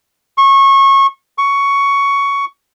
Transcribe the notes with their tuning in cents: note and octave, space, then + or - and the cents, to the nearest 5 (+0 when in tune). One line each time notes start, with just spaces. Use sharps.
C#6 -25
C#6 +10